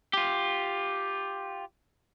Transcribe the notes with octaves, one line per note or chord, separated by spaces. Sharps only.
F4 G4